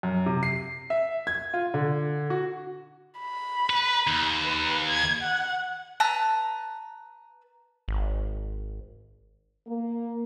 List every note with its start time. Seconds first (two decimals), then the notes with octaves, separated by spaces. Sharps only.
0.03 F#2
0.26 C3
0.43 C7
0.90 E5
1.27 G#6
1.54 F4
1.74 D3
2.30 F#4
3.20 B5
3.70 B4
4.07 D#2
4.44 B4
4.88 G#6
5.23 F#5
6.00 B4 A5 A#5 E6
7.88 G#1
9.67 A#3